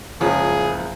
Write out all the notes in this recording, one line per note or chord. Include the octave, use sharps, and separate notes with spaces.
F#1 C#2 C#3 F3 G#4